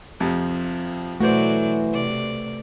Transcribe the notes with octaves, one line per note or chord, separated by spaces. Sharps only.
F2 C3 F3
B2 E3 F#3 A3 F#4 B4 C5 D5
C3 D5